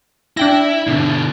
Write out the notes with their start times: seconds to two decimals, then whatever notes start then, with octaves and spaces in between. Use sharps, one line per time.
0.37 D4 E4 G5 A#6
0.87 B2 D3